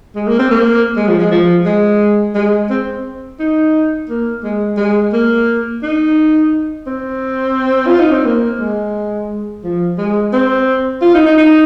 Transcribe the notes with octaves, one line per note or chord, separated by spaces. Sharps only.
G#3
A#3
C4
A#3
G#3
F3
G#3
F3
G#3
G#3
C4
D#4
A#3
G#3
G#3
A#3
D#4
C4
F4
D#4
C4
A#3
G#3
F3
G#3
C4
F4
D#4
D#4
D#4